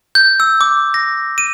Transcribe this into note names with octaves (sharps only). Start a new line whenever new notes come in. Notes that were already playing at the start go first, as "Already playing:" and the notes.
G6
E6
D6
A#6
D#7